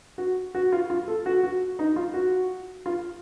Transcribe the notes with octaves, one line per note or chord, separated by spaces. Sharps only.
F#4
F#4
F4
F4
A4
F#4
F#4
D#4
F4
F#4
F4